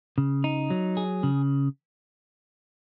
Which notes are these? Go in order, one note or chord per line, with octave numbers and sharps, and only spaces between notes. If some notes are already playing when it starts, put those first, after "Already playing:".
C#3
D#4
F#3
G#4
C#3